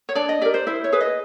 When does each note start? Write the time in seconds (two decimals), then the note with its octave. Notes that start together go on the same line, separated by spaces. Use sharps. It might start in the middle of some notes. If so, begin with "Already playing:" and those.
0.09 C#5
0.15 D4 D5
0.29 D#5
0.41 G4 A#4 D5
0.54 C5
0.67 E4 C5
0.84 C#5
0.92 G#4 B4
1.01 D#5